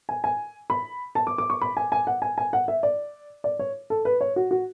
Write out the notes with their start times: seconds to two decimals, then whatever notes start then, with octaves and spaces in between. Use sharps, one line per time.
0.09 G#5
0.24 G#5
0.70 B5
1.15 A5
1.27 D6
1.38 D6
1.50 C#6
1.62 B5
1.77 G#5
1.92 G#5
2.07 F#5
2.22 G#5
2.38 G#5
2.53 F#5
2.68 E5
2.83 D5
3.44 D5
3.59 C#5
3.90 A4
4.05 B4
4.21 C#5
4.36 F#4
4.51 F#4